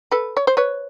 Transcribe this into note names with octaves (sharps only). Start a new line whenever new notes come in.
A4 B4
C#5
C5
B4 C#5